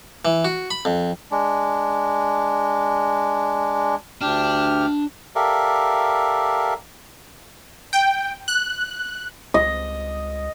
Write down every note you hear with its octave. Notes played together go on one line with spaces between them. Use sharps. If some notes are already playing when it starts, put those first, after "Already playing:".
E3
F#4
B5
F2
G#3 D4
D2 D4 G4 F6
G4 A4 A#4 D5 E5 F5
G5
F#6
C#2 D#5